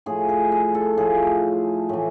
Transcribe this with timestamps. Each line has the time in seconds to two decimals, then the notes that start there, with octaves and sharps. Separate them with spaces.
0.06 A2 F3 G#4
0.29 G#4
0.52 G#4
0.75 A4
0.97 A2 F3 G#4
1.89 A2 E3